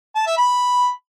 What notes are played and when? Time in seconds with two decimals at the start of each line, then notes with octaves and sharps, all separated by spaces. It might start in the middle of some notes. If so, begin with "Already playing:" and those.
0.16 A5
0.27 E5
0.38 B5